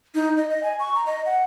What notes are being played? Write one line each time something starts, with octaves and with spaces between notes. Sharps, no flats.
D#4
D#5
D#5
G#5
C#6
A#5
D#5
F#5